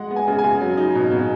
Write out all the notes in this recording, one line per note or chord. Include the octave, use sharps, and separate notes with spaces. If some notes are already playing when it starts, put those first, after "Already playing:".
Already playing: G#3 F#5
B3
G#5
C#3
G#5
C#3
F#3
D#4
B2
B2